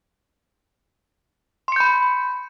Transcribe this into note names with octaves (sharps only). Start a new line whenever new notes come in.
B5 C6 G6 C#7